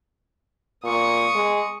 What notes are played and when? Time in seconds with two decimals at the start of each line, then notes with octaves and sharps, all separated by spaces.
0.84 A#2 C#6 D#6
1.35 G#3